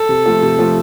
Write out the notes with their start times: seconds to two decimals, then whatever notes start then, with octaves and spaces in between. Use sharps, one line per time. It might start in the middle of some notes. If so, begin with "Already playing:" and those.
Already playing: A4
0.09 C3
0.26 F3 A3
0.43 C3
0.59 F3 A3